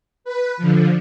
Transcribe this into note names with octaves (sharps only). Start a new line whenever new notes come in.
B4
D3 F3